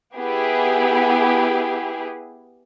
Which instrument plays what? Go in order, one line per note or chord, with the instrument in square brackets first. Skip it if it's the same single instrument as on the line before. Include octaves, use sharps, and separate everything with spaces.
[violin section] B3 E4 G4 G#4